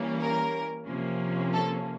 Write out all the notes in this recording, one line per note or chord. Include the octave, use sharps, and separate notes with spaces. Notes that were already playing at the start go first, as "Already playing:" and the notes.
Already playing: E3 G3 A#3 C#4
A#4
C3 F3 A#3 C#4
A4